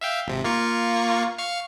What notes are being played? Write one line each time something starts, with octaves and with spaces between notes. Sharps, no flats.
E5 F5 G5
G#1 C3
A#3 F4 C#6
F5 C#6 F6